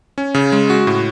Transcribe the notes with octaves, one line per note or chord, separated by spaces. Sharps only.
C#4
C#3
G#3
F#4
A2